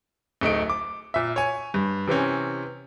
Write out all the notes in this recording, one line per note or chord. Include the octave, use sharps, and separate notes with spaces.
D1 A3 D#4 D7
D6
A#2 E5
C#5 G#5
G2
C3 E3 C4 C#4